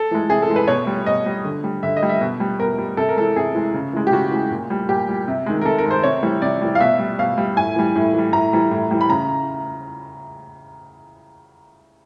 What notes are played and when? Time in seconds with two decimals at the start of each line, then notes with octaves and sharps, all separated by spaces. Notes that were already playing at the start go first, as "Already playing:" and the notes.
Already playing: A4
0.11 E3 G#3
0.30 C3 G#4
0.42 A4
0.49 E3 G#3
0.56 B4
0.68 B2 C#5
0.87 G3
1.06 B2 D#5
1.26 G3
1.45 D3
1.64 G3
1.83 D3 E5
1.97 D#5
2.03 G3
2.09 E5
2.21 B2
2.40 G3
2.60 B2 A#4
2.78 G3
2.97 C3 A4
3.09 A#4
3.16 E3 G#3 A4
3.36 C3 G#4
3.55 E3 G#3
3.74 C#3
3.93 E3 G#3
4.07 G4
4.12 C#3 F#4
4.31 E3 G#3
4.51 A#2
4.70 G3
4.89 A#2 G4
5.09 G3
5.28 C3
5.46 D#3 G#3
5.61 A#4
5.65 C3 A4
5.78 A#4
5.84 D#3 G#3
5.91 C5
6.03 C3 C#5
6.23 E3 G3
6.42 C3 D5
6.61 E3 G3
6.75 F5
6.80 B2 E5
6.99 G3
7.19 B2 F5
7.38 G3
7.57 A2 G#5
7.76 E3 G3
7.96 A2
8.14 E3 G3
8.33 A2 A#5
8.53 E3 G3
8.71 A2
8.91 E3 G3
9.01 B5
9.09 C#3 A#5